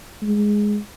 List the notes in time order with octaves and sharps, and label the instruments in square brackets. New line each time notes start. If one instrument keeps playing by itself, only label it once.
[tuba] G#3